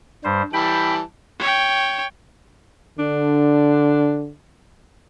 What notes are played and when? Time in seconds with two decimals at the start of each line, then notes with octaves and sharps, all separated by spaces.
0.24 G2 G3 C5
0.53 E3 G3 G5 A5 B5
1.39 C#5 G5
2.99 D3 D4